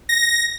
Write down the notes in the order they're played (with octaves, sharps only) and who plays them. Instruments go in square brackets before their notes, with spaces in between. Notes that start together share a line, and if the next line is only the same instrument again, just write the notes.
[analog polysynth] A#6